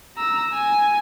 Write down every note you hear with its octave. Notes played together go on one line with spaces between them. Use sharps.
A#5 E6
G#5